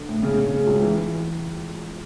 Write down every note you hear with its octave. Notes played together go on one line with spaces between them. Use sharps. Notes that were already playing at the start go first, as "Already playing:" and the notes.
Already playing: D3
A2
C#3
C#3
C#3
C#2
E3
E3